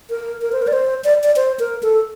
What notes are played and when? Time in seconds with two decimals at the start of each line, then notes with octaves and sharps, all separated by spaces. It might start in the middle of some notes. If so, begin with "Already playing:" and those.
0.10 A#4
0.42 A#4
0.52 C5
0.62 A#4
0.67 D5
0.73 C5
1.04 D5
1.23 D5
1.36 C5
1.59 A#4
1.83 A4